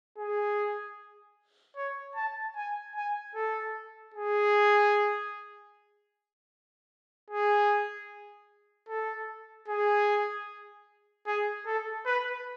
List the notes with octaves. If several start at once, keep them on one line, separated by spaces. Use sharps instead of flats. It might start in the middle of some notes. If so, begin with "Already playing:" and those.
G#4
C#5
A5
G#5
G#5
A4
G#4
G#4
A4
G#4
G#4
A4
B4